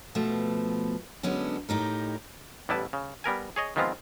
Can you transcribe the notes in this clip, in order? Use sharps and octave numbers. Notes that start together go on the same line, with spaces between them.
B2 F3 A3
D3 F#3 G#3 B3 C#4 D4
A2 D#4 G4 A#4
A1 G3 B3 E4 B4 A5
C#3
G3 B3 A#4 G#5
G#4 C#5 D#5
D#3 F3 G#3 B3 C4 F4